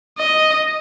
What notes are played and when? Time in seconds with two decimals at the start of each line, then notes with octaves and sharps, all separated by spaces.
0.18 D#5